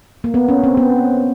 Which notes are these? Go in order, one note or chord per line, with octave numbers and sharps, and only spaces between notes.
A#3
B3
C#4
C4
B3